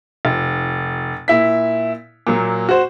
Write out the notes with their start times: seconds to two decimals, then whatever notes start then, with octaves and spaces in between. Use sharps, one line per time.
0.25 F1
1.28 A#2 E4 B6
2.27 A#2 F#3 A#3
2.69 F#4 C5